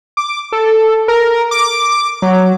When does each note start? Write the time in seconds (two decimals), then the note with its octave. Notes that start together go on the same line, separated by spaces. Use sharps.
0.17 D6
0.52 A4
1.08 A#4
1.51 D6
2.22 F#3